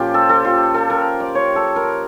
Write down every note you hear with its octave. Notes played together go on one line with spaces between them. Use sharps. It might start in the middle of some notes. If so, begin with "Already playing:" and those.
Already playing: A#2 F3 C#4 F4 G4
A4
A4
F4
A4
A#4
D5
C#5
A4
A#4